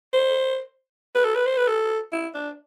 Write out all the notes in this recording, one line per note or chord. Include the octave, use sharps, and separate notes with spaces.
C5
B4
A4
B4
C5
B4
A4
E4
D4